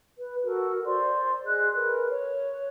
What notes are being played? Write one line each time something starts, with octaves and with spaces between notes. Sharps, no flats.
B4
F#4 A4 A#4
C5 D5 C6
G#4 D#5 F#6
A#4 B4
C#5